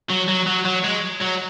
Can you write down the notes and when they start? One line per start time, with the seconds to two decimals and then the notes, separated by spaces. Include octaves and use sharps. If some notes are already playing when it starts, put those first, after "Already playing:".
0.09 F#3
0.28 F#3
0.47 F#3
0.65 F#3
0.84 G#3
1.21 F#3